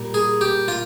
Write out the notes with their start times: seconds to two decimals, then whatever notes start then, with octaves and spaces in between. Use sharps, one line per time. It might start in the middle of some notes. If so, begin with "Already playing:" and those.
Already playing: A#2 G3
0.14 G#4
0.41 G4
0.68 F4